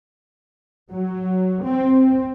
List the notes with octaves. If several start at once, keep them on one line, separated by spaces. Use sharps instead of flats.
F#3
C4